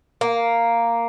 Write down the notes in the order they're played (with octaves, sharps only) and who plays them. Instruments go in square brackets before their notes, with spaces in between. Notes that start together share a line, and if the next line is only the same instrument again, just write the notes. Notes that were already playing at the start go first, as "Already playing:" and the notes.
[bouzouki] A#3